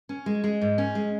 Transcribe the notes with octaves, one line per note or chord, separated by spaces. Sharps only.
C#4
G#3
G#3
G#2
C#4
G#3